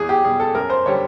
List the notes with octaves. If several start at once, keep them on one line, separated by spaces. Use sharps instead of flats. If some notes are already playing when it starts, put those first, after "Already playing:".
Already playing: E2 G#4
G4
B2 G3 G#4
A4
F#2 A#4
C5
D3 G3 C#5